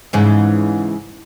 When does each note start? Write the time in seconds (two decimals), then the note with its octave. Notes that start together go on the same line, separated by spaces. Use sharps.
0.13 G#2 C#3 E3